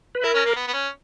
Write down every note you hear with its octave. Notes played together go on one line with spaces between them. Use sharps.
B4
E4 A#4
C#4
A#3
B3
B3
C#4